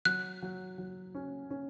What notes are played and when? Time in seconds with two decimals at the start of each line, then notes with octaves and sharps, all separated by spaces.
0.05 F#3 F#6
0.42 F#3
0.78 F#3
1.15 C#4
1.50 C#4